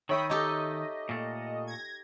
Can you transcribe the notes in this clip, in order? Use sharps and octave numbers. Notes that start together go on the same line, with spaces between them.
D#3 C#5 E5 G5 B5 C#6 D#6
D#4 G4 A4 D#5
A#2 A3
G#6 A#6